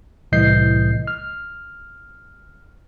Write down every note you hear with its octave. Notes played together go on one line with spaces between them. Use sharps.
C2 A2 E3 D#5 G6 C7
F6